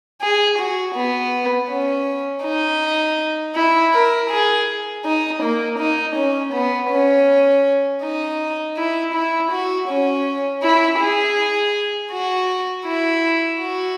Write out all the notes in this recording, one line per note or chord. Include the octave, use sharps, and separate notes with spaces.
G#4
F#4
B3
C#4
D#4
E4
A#4
G#4
D#4
A#3
D#4
C#4
B3
C#4
D#4
E4
E4
F#4
C#4
E4
G#4
F#4
E4
F#4